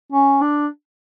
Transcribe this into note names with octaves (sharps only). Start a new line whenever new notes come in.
C#4
D4